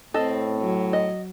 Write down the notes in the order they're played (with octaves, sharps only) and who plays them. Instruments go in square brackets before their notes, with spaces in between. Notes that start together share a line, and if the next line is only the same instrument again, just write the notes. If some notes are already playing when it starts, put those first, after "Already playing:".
[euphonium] A2 [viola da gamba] C4 [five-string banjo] A4 D#5
[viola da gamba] F#3
[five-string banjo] D#5